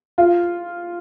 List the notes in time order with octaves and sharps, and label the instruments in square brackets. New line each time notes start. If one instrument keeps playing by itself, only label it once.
[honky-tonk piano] F4